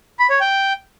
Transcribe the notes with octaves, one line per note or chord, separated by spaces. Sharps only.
B5
C#5
G5